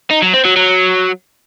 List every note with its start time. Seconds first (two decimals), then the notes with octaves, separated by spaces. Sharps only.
0.11 D#4
0.22 F#3
0.34 C4
0.45 F#3
0.56 F#3